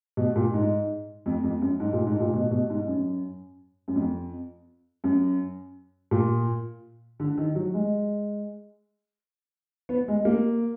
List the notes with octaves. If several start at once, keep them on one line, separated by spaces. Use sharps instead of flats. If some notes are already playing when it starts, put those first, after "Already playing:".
B2
A#2
G#2
F2
F2
F#2
G#2
A#2
G#2
A#2
B2
B2
G#2
F#2
F#2
F2
F#2
A#2
D3
D#3
F#3
G#3
B3
G#3
A#3